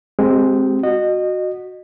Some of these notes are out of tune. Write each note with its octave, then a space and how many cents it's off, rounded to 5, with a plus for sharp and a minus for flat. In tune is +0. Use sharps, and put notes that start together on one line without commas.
G#3 +0 C4 +0 G4 -25
F#4 -5 D#5 -25